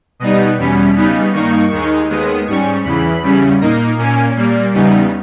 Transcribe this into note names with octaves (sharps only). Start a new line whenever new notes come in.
B2 G3 B3 D#4 D#5
E2 B2 G3 C#4 B5
C#3 G3 B3 D#4
G2 D#3 A#3 D#4 C#6
D#2 D#3 G#3 D#4
D#2 D#3 G#3 B3 D#6
G#2 G3 C#4 C#6
E2 C#3 E3 B5
E2 C#3 G3 C#4
A#2 A#3 D#4 A#5
A#2 A#3 C#4 G#5
A#2 G3 A#3
E2 C#3 G3 B3 D#4